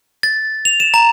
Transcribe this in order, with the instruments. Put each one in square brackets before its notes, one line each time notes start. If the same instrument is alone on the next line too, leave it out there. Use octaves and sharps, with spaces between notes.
[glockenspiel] A6
F7
E7
A#5